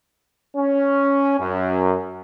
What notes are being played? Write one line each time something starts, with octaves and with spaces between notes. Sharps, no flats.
C#4
F#2